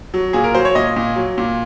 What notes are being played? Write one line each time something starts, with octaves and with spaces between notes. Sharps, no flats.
F#3
A#2 G#4
A#4
F#3 C5
C#5
A#2 D#5
A#2
F#3
A#2